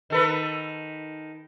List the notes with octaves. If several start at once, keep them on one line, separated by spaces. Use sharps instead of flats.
D#3 A4 B4